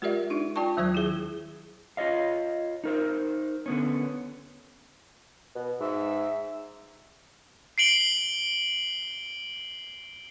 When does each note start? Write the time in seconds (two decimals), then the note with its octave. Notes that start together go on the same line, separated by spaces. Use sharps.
0.02 G#3 F4 G4 A#4 D5 E5
0.30 D4 D#4
0.56 F4 D5 G5 A5 C#6
0.77 D#2 D#3 F#3 C5 D#6 G#6
0.95 E4 G#4
1.97 F4 C#5 D#5 F5
2.84 D#4 A#4 C5
3.66 D3 B3 C#4
5.55 B2
5.80 G#2 E5
7.78 C7 D7 F#7 G7